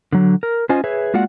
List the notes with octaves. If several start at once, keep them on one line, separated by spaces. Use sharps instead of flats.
D3 F#3
A#4
C#4 F4 C5 D#5 G#5
G#4 B4 C#5 E5
G#3 A#3 F4 F#4 D5 F#5